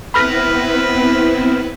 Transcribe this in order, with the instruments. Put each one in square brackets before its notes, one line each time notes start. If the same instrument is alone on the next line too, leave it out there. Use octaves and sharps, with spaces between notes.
[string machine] B3 C4 E4 [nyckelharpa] B4 [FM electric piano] B5 F6 A#6